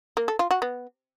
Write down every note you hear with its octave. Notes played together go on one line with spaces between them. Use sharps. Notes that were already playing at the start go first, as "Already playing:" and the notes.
A#3
A4
F4
F#4
B3